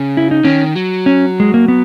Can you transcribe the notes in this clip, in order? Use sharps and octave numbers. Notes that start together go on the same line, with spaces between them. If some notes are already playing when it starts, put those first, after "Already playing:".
Already playing: C#3
E4
D#4
D#3 C#4
F#3
C#4
G#3
A#3
B3